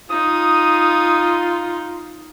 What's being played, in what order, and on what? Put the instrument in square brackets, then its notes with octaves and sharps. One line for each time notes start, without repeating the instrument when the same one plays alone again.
[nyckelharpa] D#4 [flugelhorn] F4 [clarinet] D#6